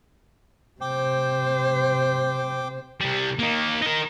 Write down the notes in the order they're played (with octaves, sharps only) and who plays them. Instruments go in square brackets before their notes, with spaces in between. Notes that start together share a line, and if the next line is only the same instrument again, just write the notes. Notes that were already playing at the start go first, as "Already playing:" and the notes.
[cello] C3 C5 [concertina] G5 D6
[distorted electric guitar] C3 G3
A#3 D#4
D#4 A#4